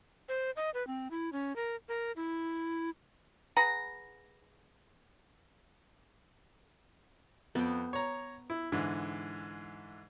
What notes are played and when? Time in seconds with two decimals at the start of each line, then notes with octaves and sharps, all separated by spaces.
0.29 C5
0.56 D#5
0.74 B4
0.87 C4
1.11 E4
1.33 C#4
1.56 A#4
1.89 A#4
2.16 E4
3.56 G#4 B4 F#5 A#5
7.55 F2 B3 G5
7.93 C#5 A#5
8.50 E4
8.72 G#2 D3 E3